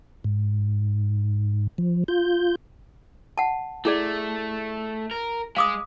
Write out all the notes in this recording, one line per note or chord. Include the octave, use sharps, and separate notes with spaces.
G#2
F3
F4 G6
F#5 A5
A3 E4 G#4 D5
A#4
G#3 F5 D6 D#6